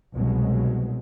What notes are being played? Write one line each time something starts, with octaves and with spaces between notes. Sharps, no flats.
C2 B2 F#3 G#3